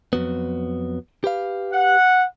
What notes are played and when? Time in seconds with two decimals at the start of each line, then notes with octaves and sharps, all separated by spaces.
0.13 F2 F#3 B3
1.24 G4 B4 F5
1.73 F#5